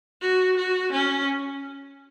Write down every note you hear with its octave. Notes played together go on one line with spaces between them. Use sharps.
F#4
F#4
C#4